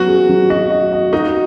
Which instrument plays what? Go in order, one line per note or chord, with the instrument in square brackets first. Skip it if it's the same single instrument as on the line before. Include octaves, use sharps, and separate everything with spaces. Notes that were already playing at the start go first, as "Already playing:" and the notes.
Already playing: [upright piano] F#3 B3 [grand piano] F#4
[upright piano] G#4
F#3
[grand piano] F#4 [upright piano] D#5
[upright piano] D#5
D#5
[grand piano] D#4 [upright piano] F#4